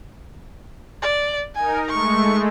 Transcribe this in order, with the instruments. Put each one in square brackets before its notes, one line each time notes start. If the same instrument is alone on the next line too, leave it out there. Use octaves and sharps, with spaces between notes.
[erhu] D5
[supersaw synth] D#4 A#4 [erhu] G#5
[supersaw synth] G#3 A3 [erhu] C#6